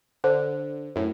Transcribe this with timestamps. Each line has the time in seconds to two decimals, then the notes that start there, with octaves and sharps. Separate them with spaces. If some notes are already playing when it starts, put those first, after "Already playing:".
0.24 D3 C5
0.96 F#2 A2